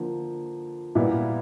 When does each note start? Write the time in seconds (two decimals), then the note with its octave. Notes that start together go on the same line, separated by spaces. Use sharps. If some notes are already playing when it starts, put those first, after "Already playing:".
Already playing: D3 F3 A#3
0.95 A#2 G3 B3 E4